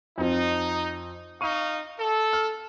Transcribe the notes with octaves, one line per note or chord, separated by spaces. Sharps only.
F2 F3 D#4
D#4 F5 C#6 D#7
A4
F6